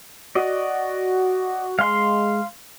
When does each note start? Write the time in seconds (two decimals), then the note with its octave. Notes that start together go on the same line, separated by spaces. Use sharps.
0.35 F#4 D5 D#5
1.79 G#3 F5 C6